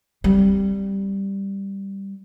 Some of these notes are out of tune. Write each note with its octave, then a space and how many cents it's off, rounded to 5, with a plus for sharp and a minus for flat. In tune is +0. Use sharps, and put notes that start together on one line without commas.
G3 +0 C4 +0